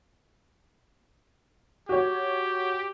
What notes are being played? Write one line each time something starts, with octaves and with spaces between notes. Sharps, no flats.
F#4 G4 C#5